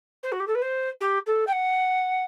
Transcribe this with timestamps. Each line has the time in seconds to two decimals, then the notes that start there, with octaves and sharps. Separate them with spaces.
0.23 C5
0.32 F#4
0.40 G4
0.47 A4
0.55 B4
0.62 C5
1.01 G4
1.27 A4
1.47 G5
1.52 F#5